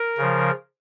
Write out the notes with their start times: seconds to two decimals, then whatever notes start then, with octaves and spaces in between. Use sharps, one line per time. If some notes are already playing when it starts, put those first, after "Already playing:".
Already playing: A#4
0.17 C#3 F3